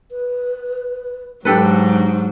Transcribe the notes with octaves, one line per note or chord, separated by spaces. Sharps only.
B4
G#2 F#3 D4 G4 A4 B4